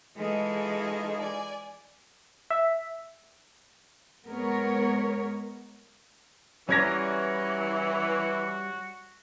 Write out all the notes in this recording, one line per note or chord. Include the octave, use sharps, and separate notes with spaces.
E3 G#3 D#4 F4 G#4 A4
D5 G#5
E5
G#3 B3 A#4 C#5
E3 G3 C#4 F#4 D5 A#5 G#6 A#6